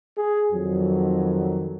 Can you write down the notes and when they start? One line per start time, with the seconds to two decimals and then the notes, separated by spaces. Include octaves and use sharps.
0.18 G#4
0.52 F2 D#3 F#3